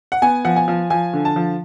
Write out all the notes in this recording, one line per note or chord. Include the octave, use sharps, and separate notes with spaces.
F#5
B3 G#5
F3 F#5
G#5
F3
F3 G#5
D3
A5
F3